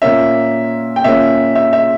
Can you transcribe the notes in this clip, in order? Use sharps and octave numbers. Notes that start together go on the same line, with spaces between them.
A#2 A#3 C#4 E5
G5
A#2 A#3 C#4 E5
E5
E5